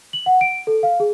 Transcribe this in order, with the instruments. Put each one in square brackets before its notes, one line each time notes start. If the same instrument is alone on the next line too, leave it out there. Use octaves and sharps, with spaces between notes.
[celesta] F#7
F#5
D7
A4
F5
G#4